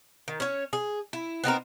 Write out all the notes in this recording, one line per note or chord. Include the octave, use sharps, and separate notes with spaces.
D#3
C#4 C#5
G#4
E4
B3 C4 D#4 A#4